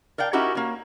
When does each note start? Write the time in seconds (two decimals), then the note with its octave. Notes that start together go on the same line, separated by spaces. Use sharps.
0.18 A#4 D5 F5 G5
0.33 C#4 D#4 E4 F#4 G4 A#4
0.55 A#3 C#4